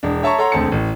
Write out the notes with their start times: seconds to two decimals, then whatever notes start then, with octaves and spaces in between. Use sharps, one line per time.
0.03 E1 D4
0.23 C#5 E5 A5 A#5 C#6
0.38 A4 C#5 F#5 A#5 C6
0.52 E1 D2 C4 A5 C#7
0.72 A1